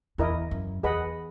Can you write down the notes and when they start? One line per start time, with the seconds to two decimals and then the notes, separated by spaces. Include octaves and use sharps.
0.18 E2 E4 A#4 D#5
0.51 F#2
0.83 E2 G#4 B4 D#5 F#5 B5